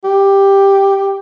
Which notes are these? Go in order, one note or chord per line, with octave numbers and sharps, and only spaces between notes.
G4